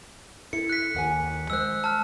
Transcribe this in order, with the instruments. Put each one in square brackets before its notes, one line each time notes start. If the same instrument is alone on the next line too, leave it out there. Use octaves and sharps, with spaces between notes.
[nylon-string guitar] E4 A4 [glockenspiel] C#7
[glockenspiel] F#6 B6
[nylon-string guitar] D#2 F#5 G#5
[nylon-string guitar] G#3 C5 [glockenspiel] E6 F#6
[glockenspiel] A5 F6